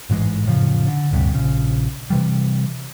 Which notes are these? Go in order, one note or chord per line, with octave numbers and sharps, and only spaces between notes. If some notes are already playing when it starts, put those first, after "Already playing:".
A1 G#2 E3 G#3
F1 A2 C#3 F3
D3
A1 D2 G2 C3
A#1 C#3
C3 E3 G3